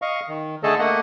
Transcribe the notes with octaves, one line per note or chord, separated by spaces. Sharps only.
D#5 F5 C#6
D#3
D3 A3 G#4 A4 D#5 A5
A3 A#3 D#5 F#5